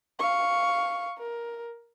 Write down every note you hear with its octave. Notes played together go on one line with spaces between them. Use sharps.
F5 C#6
A#4